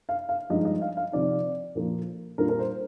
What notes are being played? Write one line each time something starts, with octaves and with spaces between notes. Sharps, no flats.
F5
F5
G2 F3 G#3 D#4 D#5
D#5
F5
F5
C3 F3 C4 D#4 D5
A#2 F3 A#3 F4
A#2 G3 D4 F4 A#4
A#4
C5